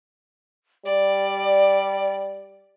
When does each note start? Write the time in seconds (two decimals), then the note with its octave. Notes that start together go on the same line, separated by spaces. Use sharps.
0.85 G3 D5